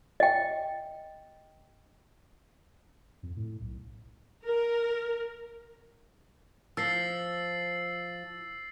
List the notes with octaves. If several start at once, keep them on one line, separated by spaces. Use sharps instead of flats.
D#5 G5
F2
A2
B1
A#4
F3 E6 A6 C7